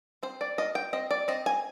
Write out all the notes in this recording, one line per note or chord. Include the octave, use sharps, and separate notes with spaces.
C4 C5
D5
F4 D#5
G5
C4 D#5
D5
C4 D#5
G#5